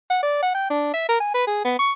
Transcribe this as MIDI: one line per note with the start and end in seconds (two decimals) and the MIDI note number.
0.10 0.19 78
0.23 0.38 74
0.42 0.51 78
0.55 0.69 79
0.70 0.90 62
0.94 1.07 76
1.09 1.19 70
1.20 1.30 80
1.34 1.46 71
1.47 1.61 68
1.65 1.76 59
1.79 1.92 85